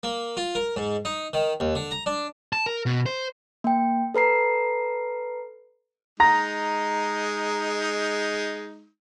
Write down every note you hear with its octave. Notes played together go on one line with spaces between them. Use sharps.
A#3
F4
A#4
G#2
D#4
D#3
D#2
D3
A#5
D4
A5
A#4
B2
C5
A#3 G5
A4 B4 A#5 C7
G#3 D#4 A#5 A#6